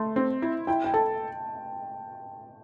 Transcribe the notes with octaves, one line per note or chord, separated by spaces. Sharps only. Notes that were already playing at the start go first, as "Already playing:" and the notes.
Already playing: A3 C6
C4
E4
E4 G5
G5
A4 A5